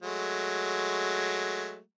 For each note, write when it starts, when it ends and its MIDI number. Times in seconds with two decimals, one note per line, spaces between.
0.03 1.79 54
0.03 1.79 56
0.03 1.79 57